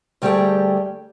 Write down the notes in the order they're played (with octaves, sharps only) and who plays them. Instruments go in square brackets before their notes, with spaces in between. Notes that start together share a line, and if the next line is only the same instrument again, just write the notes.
[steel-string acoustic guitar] D2 G3 A3 G4 G#4 G5